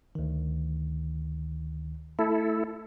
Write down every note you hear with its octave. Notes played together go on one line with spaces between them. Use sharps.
D2 D#3
A3 E4 A4